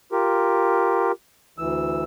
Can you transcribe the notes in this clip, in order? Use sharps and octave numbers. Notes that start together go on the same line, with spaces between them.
F4 G4 A#4
D2 E3 E6